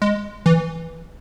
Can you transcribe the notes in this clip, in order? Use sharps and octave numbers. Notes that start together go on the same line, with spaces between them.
G#3
E3